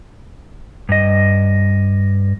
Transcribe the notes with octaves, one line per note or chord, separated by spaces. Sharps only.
G2 D#5